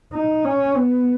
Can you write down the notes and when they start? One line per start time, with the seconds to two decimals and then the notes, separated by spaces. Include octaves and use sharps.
0.13 D#4
0.44 C#4
0.76 B3